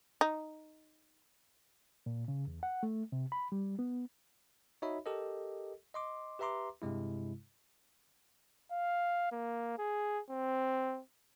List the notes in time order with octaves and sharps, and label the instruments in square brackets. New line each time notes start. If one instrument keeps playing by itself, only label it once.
[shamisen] D#4
[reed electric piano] A#2
C#3
E2
F#5
A3
C3
B5
G3
B3
[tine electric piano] D#4 F#4 C#5 D#5 E5 B5
G4 A4 A#4 D#5
D#5 C6 D6
G4 B4 E5 A#5 C6 D6
G2 C3 G#3 E4
[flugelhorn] F5
A#3
G#4
C4